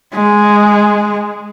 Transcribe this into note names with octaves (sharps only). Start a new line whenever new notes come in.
G#3